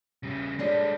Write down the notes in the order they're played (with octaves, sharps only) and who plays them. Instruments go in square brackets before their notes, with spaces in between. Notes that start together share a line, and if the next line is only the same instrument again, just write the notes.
[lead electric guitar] C#3 G3
[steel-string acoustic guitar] A2 D4 A4 [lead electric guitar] G3 G#3